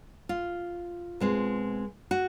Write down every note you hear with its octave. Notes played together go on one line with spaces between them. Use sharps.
F4
B2 G#3 C4
F#4